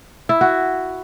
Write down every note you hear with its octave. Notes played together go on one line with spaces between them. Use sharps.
E4
F#4